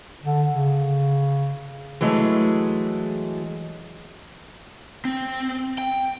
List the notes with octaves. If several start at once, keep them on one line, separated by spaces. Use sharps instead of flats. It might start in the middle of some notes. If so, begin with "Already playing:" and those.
D3
C#3
E3 F#3 G#3 A3
C4
G5